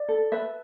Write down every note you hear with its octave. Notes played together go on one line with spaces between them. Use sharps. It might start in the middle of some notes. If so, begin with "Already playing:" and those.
Already playing: D5
A4
B4 E5